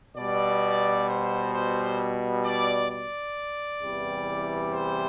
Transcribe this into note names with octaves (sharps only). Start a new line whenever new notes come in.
B2 G3 D5
C5
C5
D5
D5
E2 C3 E3 G3
C5